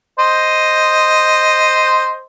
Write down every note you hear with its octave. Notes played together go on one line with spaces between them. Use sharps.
C5 D#5